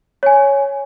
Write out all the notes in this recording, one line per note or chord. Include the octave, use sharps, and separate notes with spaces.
C#5 G#5